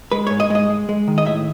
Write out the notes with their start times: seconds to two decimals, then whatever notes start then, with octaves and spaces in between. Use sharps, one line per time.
0.12 G#3 B4
0.27 C#5
0.30 G#2
0.40 D#5
0.50 G#3 D#5
0.70 G#3
0.89 G#3
1.08 D#3
1.18 D#5
1.26 A2 E5